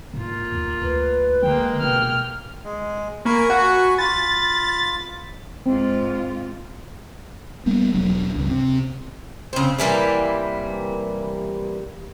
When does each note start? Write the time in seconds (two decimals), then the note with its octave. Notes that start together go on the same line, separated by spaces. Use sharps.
0.14 G#2 A#3 F4
0.52 D#2
0.82 D2 B4
1.42 D3 G#3 A#3 G5
1.81 B2 G5 F6
2.64 G#3
3.25 A#3 G#5 B5 C#6
3.50 F#4
3.98 F4 B5 A6
5.66 G#2 C4 F4
7.66 G3 A#3 B3
7.93 E1 F#3 D4
8.36 C#2 G2
8.50 C3
9.53 C#3 C4
9.79 C3 E3 G3 A#3